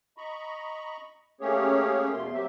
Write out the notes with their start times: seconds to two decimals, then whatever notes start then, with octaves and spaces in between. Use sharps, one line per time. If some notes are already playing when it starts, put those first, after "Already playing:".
0.17 D#5 A#5 B5 C#6
1.41 A3 A#3 C#4 G4 G#4 C#5
2.14 E2 B2 A3 C6
2.32 F#3 A#3 C4 G4 E5